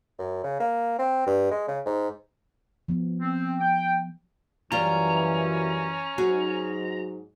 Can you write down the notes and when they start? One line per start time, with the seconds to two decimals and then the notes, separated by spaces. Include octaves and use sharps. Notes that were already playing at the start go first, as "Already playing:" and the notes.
0.19 F#2
0.44 C#3
0.60 A#3
0.98 C4
1.27 G2
1.51 G#3
1.68 C#3
1.85 G#2
2.88 F3 B3
3.21 C4
3.59 G5
4.72 F#2 E3 G3 C#4 F4 A#5
6.18 G#2 F#3 F#4 G#4